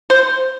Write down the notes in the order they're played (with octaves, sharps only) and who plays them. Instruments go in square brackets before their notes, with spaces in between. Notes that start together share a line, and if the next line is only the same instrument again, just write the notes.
[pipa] C5